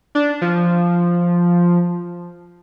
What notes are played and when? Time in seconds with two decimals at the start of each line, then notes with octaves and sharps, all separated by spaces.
0.15 D4
0.41 F3